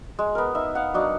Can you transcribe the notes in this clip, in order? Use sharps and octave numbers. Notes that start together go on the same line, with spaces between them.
G#3
B3 A#4
D#4 E5
F5 F#5
F#3 D4 D#4